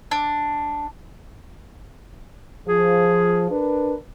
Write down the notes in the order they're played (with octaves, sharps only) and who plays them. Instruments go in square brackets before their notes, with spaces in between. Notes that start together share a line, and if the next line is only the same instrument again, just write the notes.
[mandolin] D4
[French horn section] F3 [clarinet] G#4
[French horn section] D4 A#4 B4